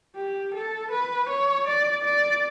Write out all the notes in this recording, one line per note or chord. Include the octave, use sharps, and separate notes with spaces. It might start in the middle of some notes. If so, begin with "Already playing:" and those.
G4
A4
B4
C#5
D5
D5